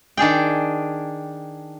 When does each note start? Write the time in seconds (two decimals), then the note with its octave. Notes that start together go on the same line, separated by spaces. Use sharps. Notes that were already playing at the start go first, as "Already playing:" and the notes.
0.17 D#3 D4 G#4 G5